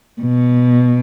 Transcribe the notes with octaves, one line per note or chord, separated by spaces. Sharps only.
B2